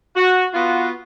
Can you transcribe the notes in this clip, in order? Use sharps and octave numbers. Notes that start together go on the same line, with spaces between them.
F#4
B3 F4 F#4